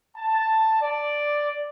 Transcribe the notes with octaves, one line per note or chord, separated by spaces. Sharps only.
A5
D5